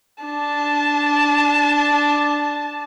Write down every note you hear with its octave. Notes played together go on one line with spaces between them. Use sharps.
D4 A5